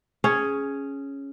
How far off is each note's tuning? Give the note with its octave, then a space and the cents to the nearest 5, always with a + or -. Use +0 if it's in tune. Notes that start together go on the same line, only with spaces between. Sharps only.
C#4 +0 G#4 +5